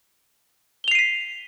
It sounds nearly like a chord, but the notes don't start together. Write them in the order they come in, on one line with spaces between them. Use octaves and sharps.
G7 F7 C7 D#7 B6